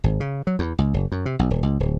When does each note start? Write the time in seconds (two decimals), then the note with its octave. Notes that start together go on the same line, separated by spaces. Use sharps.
0.04 G#1
0.20 C#3
0.47 F#3
0.59 E2
0.78 C#2
0.94 F#1
1.12 F#2
1.26 C3
1.39 B1
1.50 D#1
1.63 C#2
1.80 D1